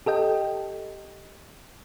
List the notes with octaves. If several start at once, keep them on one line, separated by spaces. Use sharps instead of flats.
G4 A4 D#5 G5